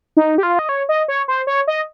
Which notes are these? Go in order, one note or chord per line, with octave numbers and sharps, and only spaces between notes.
D#4
G4
F4
D#5
C#5
D#5
C#5
C5
C#5
D#5